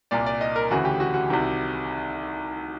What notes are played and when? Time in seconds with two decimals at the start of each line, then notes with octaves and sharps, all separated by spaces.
0.11 C2 A#2 D5
0.26 D5
0.41 D#5
0.56 A#4
0.70 D2 C#3 E3 F#4
0.85 G4
1.00 F#4
1.14 F#4
1.30 C2 C3 D#3